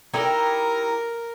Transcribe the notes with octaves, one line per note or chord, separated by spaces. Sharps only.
D#4 E4 G4 A#4